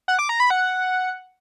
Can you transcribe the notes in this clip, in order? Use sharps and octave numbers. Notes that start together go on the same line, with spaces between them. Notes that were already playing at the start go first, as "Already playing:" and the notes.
F#5
D6
A#5
B5
F#5